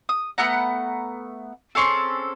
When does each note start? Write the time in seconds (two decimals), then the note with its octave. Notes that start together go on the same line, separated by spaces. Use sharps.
0.09 D#6
0.38 A3 B3 F#5 A#5
1.75 C4 C#4 G#4 A4